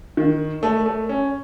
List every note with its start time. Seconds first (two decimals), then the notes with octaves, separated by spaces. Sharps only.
0.17 D#3
0.63 A3
0.86 A3
1.09 C#4